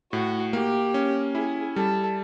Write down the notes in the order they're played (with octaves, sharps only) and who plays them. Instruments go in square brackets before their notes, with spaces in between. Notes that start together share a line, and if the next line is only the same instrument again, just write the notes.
[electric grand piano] A2 [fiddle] F#4
[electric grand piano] A#3 [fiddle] G4
[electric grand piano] C#4
[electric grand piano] E4 [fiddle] G#4
[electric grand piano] G3 [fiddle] A4